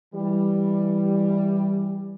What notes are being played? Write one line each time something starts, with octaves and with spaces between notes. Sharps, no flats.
E3 G3